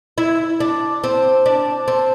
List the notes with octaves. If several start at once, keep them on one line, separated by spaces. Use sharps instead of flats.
E4
D4
C4
D4
C4